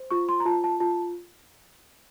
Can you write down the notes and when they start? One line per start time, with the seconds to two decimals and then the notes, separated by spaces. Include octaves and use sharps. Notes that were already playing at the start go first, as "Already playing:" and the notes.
Already playing: C5
0.10 F4 C#6
0.29 C6
0.40 A#5
0.45 F4 A5
0.64 A5
0.80 F4 A5